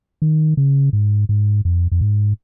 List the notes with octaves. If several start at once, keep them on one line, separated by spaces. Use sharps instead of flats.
D#3
C#3
G#2
G#2
F2
F2
G#2